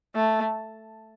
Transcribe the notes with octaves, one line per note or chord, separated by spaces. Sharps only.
A3